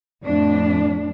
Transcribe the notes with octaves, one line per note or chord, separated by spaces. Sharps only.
F2 A2 D4